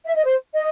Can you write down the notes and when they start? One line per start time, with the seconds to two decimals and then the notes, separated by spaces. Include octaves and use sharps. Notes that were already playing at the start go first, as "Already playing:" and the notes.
0.05 E5
0.15 D#5
0.25 C5
0.55 D#5